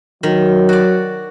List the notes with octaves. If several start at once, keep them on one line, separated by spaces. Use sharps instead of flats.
D#3 F#3
F#4 D5